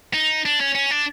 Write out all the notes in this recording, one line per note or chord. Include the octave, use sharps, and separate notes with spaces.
D#4
D4
C#4
C#4
D4